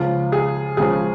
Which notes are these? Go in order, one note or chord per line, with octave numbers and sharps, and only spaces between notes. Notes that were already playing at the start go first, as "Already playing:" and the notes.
Already playing: C#2 C#3 F3 F4
G#4
C#2 C#3 F3 G#4